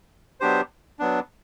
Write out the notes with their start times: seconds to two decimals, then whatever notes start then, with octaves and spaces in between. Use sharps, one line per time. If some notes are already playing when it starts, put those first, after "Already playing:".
0.40 F#3 B3 D4 G4 C5
0.99 F#3 B3 D4